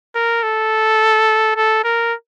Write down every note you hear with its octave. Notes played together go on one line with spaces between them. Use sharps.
A#4
A4
A4
A#4